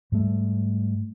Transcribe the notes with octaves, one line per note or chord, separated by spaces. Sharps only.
G#2 G3 A3